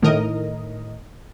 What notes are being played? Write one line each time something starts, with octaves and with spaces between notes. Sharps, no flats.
A2 D#3 A#4 D#5